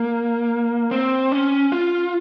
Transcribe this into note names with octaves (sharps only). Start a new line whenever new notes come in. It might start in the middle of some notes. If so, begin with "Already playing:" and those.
Already playing: A#3
C4
C#4
F4